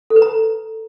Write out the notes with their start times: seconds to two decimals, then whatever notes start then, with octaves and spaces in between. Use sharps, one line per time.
0.10 A4
0.16 B4
0.22 A#5